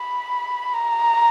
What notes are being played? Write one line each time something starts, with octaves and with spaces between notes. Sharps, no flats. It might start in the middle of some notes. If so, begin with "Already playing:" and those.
Already playing: B5
A#5